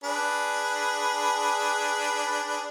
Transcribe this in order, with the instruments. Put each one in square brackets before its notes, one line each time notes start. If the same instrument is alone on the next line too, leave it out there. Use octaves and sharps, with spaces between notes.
[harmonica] D4 G#4 B4